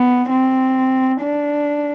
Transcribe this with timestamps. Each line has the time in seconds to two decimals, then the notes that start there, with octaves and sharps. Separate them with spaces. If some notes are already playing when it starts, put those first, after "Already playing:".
Already playing: B3
0.30 C4
1.21 D4